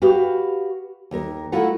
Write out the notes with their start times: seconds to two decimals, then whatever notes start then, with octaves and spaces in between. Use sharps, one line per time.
0.02 F#4 G4 B4 F5
1.11 D#2 A#4
1.52 A3 E4 F4 A#4 F#5